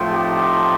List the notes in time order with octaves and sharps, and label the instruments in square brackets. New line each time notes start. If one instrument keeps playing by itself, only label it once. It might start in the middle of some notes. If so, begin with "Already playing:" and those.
Already playing: [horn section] A2 F3 A3 C4
D#4 G4